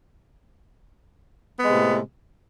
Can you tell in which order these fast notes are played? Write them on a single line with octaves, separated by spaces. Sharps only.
B3 G#3 C3 A2